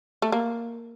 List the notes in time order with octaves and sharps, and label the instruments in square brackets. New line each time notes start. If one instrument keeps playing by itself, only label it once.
[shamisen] A3
A#3